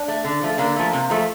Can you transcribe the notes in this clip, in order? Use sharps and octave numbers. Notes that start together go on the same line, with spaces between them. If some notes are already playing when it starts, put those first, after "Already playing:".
Already playing: D4
A3
D3
F3 A3
D3 A#3
F3 A3
C3
F3 A3